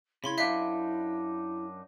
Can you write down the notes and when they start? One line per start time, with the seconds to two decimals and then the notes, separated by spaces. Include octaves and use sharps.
0.24 C#3 E4 B5 C6 G#6
0.38 F#2 D4 D#4 E5 F5 B6